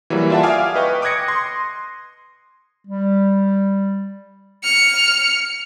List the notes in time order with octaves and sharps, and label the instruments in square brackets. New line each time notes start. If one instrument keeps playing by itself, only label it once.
[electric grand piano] E3 F#3 G3 A#3
F4 D5 E5 F#5 A5
E5 F5 G#5 D6 D#6 F6
B4 D#5 G5 C#6
D6 D#6 F#6 G#6 A#6 C#7
C6
[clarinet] G3
[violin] F6 C#7